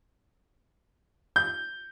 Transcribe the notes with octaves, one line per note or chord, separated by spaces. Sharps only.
G6